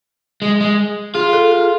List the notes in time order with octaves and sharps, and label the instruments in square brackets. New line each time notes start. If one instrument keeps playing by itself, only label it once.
[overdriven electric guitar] G#3
G#3
[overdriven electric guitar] F4 [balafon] G#4
[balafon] A4
G#4